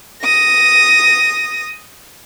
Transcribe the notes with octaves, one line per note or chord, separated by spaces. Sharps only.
D#6 A#6